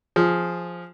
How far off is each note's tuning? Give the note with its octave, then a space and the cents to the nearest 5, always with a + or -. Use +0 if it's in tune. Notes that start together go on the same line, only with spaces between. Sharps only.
F3 +0 G#4 +0